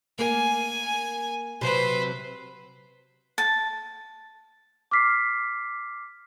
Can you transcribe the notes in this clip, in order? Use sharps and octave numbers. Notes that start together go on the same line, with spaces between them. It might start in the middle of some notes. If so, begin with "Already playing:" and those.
A#3 A#4 G#5
C3 F#3 B4 C5
A5
D6 F6 B6 C7